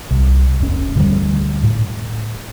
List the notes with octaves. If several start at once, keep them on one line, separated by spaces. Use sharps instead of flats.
C2
F1 C#4
D2 D3 E3 G3
A2